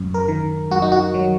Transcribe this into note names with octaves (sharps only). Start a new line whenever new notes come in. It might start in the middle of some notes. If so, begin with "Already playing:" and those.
Already playing: F#2
A#4
D#3
F#2 F#4
D#4
F#4
F#3